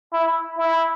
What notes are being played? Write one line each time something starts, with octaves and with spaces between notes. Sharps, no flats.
E4
E4